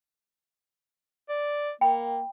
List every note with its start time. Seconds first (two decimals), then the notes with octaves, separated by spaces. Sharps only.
1.29 D5
1.81 A#3 G5 B5